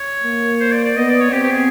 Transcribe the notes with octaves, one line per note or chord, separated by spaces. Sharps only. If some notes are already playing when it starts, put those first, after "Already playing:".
Already playing: C#5
A#3
C5
D5
D5
B3 D#5
D5
C#5
C4 G4
G4
G#4